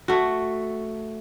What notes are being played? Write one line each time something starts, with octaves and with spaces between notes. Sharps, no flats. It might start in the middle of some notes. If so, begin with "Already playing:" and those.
A3 F#4